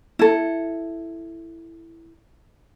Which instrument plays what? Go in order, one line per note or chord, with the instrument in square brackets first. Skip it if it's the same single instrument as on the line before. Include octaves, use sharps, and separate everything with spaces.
[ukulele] E4 A4